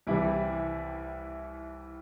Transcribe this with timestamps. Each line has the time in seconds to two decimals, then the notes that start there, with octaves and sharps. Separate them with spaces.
0.07 C2 C3 E3 G3 E4